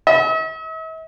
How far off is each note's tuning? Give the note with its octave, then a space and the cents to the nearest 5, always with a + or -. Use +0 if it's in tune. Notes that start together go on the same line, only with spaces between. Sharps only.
E5 -45